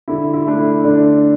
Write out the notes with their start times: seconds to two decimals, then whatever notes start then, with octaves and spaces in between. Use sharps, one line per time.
0.08 D3 E4
0.34 E4
0.47 A3 D4
0.59 E4
0.84 D3 D4